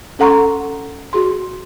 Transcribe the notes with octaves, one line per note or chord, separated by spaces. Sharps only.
C#4 A4 F#5 A#5 C6 C#6
F#4 G#4 C6